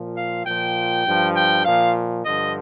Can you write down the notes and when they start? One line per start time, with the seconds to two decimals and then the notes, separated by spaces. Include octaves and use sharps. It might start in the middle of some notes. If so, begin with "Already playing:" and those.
Already playing: A#2 F3
0.14 F5
0.44 A#2 F3 G5
1.05 G2 F3
1.34 G5
1.64 A#2 F3 F5
2.24 G2 D3 F3 D#5